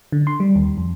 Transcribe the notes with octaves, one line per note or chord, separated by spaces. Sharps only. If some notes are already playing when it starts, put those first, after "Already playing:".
D3
C6
G3
D#2
F2